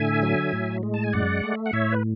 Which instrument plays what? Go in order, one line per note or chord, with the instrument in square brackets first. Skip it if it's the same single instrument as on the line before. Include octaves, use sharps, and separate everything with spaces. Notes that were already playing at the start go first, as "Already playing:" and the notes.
Already playing: [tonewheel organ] A2 D3 E5 G#5
F#3
A2
G#3
A5
G#5
F#2 D5 F#5
A3
F#5
A2 C#5 E5
B4